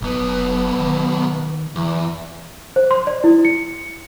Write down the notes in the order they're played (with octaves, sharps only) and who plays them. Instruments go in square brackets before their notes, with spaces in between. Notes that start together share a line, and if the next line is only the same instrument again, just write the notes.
[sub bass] F1 [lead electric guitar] B1 B3
[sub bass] D#3
[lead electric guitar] E2
[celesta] C5
C6
D5
E4
C#7